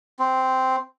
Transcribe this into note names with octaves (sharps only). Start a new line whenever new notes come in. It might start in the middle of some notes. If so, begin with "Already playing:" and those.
C4